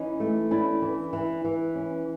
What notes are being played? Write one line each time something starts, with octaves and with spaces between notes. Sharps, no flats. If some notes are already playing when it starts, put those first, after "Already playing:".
Already playing: E3 C#4 D#4
A3
C#4 D4 E4
E3
E3
E3
C#4